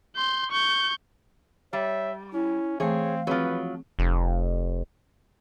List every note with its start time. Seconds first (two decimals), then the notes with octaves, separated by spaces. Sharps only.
0.16 C6 G6
0.51 C#6 G6
1.73 G3 C#5 E5
2.33 C#4 E4
2.80 E3 A3 C4 G#4 C#5 F5
3.27 F3 F#3 C4 G#4 B4 C#5
3.99 F1